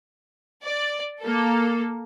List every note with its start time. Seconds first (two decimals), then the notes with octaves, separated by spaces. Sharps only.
0.64 D5
1.22 A#3 A4